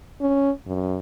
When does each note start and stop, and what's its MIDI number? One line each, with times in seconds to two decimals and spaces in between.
0.21 0.51 61
0.67 0.99 42